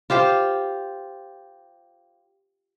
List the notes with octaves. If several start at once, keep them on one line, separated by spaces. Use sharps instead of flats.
F4 G4 C5 F5